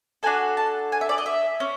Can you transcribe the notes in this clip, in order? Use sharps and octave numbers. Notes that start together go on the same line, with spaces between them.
D4 F#4 A4 G#5
A5
G#5
E5
D5
D#5
E5
C#4